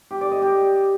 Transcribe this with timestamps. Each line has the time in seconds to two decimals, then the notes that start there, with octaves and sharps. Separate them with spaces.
0.11 G4
0.21 D5
0.32 D#5
0.42 G4